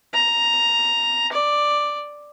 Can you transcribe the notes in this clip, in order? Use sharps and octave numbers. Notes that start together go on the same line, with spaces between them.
A#5
D5